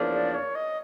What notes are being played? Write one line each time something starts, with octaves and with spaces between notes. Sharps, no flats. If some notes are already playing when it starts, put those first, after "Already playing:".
Already playing: E2 C#3 F3 A#3 D4
D5
C#5
D#5